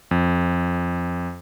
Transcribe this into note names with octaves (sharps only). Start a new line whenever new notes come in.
F2